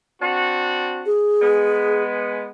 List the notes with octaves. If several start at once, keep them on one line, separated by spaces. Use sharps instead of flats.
C4 D4 F#4
G#4
G#3 B3